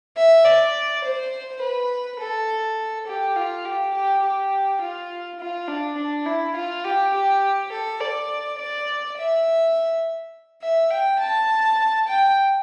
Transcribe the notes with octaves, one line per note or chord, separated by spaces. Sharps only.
E5
D5
C5
B4
A4
G4
F4
G4
G4
G4
F4
F4
D4
D4
E4
F4
G4
G4
A4
D5
D5
E5
E5
G5
A5
G5